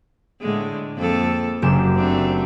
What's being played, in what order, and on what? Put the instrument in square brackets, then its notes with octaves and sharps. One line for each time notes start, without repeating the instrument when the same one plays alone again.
[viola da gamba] A2 D3 G#3
F2 A#3 A4
[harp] F#1 G4 E7 [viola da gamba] F#2
[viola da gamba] A3 C4 D4